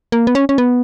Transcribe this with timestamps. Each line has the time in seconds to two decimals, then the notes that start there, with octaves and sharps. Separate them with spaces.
0.12 A#3
0.27 B3
0.35 C#4
0.49 C#4
0.58 B3